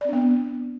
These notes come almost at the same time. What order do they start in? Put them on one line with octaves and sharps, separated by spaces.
D5 C4 D4 B3